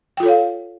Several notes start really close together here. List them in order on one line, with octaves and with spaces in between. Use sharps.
G5 F4 A4 C#5 F5